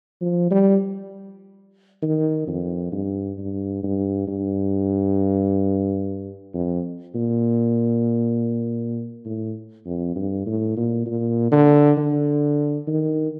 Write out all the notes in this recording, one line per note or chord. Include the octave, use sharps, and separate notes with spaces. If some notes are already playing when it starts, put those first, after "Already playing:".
F3
G3
D#3
F2
G2
G2
G2
G2
F2
A#2
A2
F2
G2
A2
A#2
A#2
D3
D3
D#3